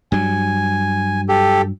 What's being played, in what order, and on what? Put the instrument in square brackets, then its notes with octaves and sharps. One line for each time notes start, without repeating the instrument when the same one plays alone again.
[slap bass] G2 F#3 [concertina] G#5
[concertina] G4 A4